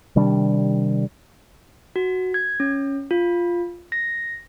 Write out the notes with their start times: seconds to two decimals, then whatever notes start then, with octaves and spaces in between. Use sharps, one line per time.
0.16 C3 D#3 G3 D4
1.96 F#4
2.34 G#6
2.60 C#4
3.11 F4
3.92 A#6